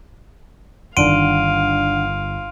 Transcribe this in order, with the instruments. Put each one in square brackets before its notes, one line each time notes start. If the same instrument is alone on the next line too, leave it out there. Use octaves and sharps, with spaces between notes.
[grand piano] G1 [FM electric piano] D#3 D4 F#5 [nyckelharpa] F5 [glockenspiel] C6 D7 D#7